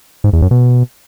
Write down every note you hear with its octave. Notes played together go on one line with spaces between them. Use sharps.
G#2
E2
F#2
B2